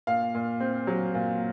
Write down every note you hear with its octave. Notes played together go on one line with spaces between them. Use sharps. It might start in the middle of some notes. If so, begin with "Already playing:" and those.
A#2 F5
A#2
C4
F#3
A#2